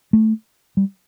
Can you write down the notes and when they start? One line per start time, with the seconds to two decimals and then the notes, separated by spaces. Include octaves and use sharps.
0.13 A3
0.77 G3